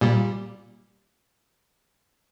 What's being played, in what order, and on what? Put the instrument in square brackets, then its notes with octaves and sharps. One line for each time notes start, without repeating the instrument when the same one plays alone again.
[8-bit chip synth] A#2 G3